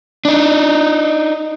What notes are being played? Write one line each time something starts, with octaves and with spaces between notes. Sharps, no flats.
D4 D#4